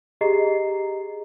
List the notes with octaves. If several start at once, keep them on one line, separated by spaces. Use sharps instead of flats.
G4 G#4 D#5 A#5 C7